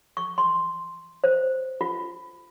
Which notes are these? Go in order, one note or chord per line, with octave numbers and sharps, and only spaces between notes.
C#6
C6
C5
F4